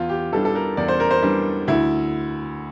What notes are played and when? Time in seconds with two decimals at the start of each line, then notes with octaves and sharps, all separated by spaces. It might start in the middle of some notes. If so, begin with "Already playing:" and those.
Already playing: E2 F4
0.09 G4
0.32 E3 G3 D4 A4
0.45 A4
0.55 A#4
0.77 E2 D5
0.88 C5
1.00 A#4
1.11 C5
1.23 E3 G3 D4
1.67 D2 E4